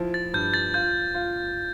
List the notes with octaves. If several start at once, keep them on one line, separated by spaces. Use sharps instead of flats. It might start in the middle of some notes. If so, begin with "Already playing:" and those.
Already playing: F3 E4
A6
G2 G6
A6
F4 G6
F4